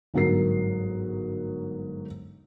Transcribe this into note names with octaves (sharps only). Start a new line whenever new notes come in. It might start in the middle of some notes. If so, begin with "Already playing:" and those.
G1 G#2 F#3 F#4 A#4 C7